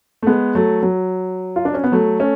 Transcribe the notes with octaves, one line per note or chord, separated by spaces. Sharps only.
A3
G#3 B3
F#3 A3
F#3
F4
D4
C#4
B3
F#3 A3
A3 C#4